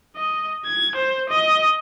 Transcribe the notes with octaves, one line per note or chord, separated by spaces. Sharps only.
D#5
G#6
C5
D#5